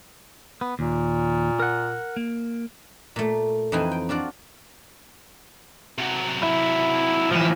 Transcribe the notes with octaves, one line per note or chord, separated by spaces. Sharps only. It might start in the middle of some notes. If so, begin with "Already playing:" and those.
B3
D#2 A#2
A#4 F#5
A#3
A#2 A3
F2 E3 C4 D#4 E4 G#5
G5
D4 F4 F#4 D5
C3 F#3
E4
A2 E3 F3 E5